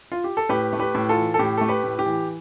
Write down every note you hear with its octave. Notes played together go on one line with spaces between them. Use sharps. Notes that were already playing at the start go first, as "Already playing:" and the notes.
F4
G4
A4
A2 G4 B4
A3
G4 B4
A2
F4 A4
E3
A4
A2 G4
A3 A4
G4 B4
A2
G4
E3